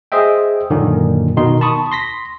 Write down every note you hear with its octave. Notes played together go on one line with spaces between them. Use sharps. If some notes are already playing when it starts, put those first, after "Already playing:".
G#4 C5 D#5 E5 G5
F#2 A#2 D3 D#3 A#3 C#4
B2 D#3 D#4 C6
A5 B5 C#6 D#6
C6 A#6 B6